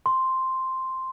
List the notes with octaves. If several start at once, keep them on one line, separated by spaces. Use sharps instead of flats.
C6